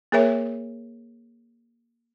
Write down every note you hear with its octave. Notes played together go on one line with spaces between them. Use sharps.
A#3 G#4 A#4 C#5 E5